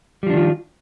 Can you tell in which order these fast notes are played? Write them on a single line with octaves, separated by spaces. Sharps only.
G3 F3 D4 D#3 F4